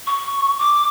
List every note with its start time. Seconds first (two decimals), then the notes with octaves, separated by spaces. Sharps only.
0.07 C#6
0.59 D6